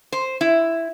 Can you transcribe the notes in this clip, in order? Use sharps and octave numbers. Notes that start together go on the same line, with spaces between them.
C5
E4